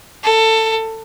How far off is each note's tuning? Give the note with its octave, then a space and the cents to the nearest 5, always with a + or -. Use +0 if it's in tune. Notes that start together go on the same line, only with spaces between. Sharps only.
A4 +20